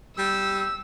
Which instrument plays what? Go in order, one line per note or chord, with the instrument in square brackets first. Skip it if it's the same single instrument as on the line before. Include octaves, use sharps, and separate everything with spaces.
[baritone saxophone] G3 [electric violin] E6